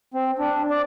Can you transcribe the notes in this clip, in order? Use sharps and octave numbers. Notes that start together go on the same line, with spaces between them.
C4
D4
D5